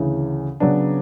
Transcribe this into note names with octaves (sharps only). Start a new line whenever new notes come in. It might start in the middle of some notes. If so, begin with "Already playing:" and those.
Already playing: D2 C#3 E3
C#3 F#3 B3 D4